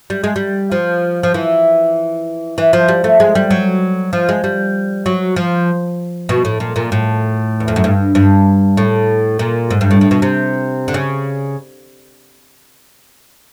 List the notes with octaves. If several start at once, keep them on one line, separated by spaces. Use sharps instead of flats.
G3
G#3
G3
F3
F3
E3
E3
F3
G3
A3
G#3
G3
F#3
F3
G#3
G3
F#3
F3
B2
A2
A#2
A#2
A2
E2
F2
F#2
G2
G2
A2
A#2
G#2
G2
A2
A2
B2
C3
D3
C#3